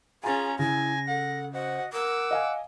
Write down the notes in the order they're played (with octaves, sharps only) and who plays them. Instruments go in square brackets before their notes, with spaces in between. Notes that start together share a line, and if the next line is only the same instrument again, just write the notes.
[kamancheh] C#4 F4 [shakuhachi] G#4 [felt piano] G#5 A6 [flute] A#5
[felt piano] C#3 [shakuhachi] E4 [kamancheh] G#5 [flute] A#6
[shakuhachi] A4 [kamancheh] F#5
[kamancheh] F#4 F#5 [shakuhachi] C5 [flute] D#5
[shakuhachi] A#4 [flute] F#5 [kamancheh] D6 E6
[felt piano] D#5 F5 G#5